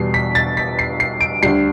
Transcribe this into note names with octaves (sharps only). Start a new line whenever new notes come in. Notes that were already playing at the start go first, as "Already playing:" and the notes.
Already playing: E2 B2 G3 C7
B6
A6
B6
C7
C7
D7
D2 D3 G3 C7